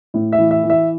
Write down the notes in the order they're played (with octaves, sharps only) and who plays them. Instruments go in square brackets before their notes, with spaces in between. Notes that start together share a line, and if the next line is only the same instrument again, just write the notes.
[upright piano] A2
E5
E3
E5
E3
E5